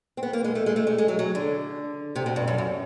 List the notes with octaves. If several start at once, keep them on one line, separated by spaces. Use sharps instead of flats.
C4
B3
A#3
G#3
A3
G#3
A3
G#3
G#3
F#3
F#3
D3
C3
B2
G2
F#2
F#2